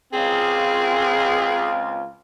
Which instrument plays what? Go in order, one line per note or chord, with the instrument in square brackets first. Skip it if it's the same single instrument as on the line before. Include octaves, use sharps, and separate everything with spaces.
[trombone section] C#2 F4 [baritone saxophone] C4 [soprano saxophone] G#4